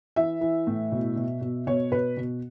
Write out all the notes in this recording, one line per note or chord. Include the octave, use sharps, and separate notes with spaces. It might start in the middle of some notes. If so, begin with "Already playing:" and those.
E3 E5
E3
A2
B2
B2
B2
B2 C#5
B2 B4
B2